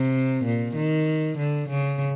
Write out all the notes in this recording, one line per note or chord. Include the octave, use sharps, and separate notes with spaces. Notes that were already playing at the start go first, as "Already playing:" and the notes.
Already playing: C3
A#2
D#3
D3
C#3